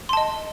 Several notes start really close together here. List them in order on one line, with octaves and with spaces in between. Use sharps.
C6 A5 D#5